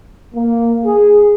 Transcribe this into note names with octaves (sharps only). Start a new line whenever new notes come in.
A#3
G#4